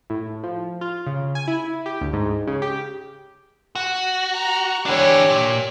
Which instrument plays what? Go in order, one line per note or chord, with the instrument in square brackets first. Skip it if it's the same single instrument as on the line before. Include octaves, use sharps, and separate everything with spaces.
[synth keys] A2
F3
F4
C#3
G#5
E4
G4
D2
G#2
C#3
G4
[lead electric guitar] F#4
[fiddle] A#5
[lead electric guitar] E3 D4 [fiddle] G4 C#5
[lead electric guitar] A#2